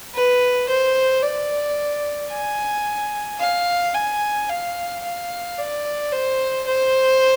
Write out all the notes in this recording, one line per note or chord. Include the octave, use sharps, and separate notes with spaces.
B4
C5
D5
G#5
F5
G#5
F5
F5
D5
C5
C5